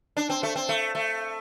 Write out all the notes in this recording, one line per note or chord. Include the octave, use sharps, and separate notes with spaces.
D4
C4
A3
C4
A3
A3